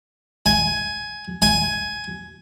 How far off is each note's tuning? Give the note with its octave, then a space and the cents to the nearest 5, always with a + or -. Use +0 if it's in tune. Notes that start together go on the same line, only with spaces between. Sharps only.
G#5 +10
G#5 +10